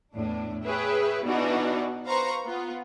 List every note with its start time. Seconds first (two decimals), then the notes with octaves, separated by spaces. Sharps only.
0.14 E2 A2 D4
0.65 G#4 B4 C#5 E5 G5
1.24 B2 E3 D4 D#4 F#4
2.07 B4 C5 F5 A#5 C#6
2.44 B3 F4